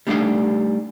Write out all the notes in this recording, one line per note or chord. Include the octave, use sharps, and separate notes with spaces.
G3 A3 D4 D#4 G4 F5